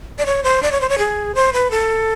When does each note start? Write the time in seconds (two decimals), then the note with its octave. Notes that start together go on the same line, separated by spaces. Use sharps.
0.19 D5
0.26 C#5
0.44 C5
0.63 D5
0.72 C#5
0.81 C5
0.89 C#5
0.98 G#4
1.35 C5
1.53 B4
1.71 A4